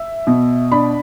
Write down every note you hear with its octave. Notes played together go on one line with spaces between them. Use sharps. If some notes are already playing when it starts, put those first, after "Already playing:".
Already playing: E5
B2
D4 B5